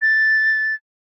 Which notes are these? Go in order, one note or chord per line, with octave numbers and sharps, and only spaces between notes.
A6